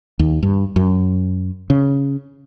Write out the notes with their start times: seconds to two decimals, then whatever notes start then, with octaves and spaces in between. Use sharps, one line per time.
0.19 D#2
0.43 G2
0.76 F#2
1.70 C#3